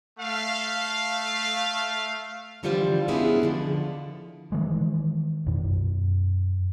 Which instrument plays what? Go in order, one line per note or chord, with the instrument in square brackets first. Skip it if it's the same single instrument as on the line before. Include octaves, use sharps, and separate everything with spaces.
[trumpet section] A3 F5
[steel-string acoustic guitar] D3 E3 F3 G3 F4 C5
G#3 B3 C#4 D4 E4 G#4
B2 D3 F3
[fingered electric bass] D#3 E3 G#3
F#2 B2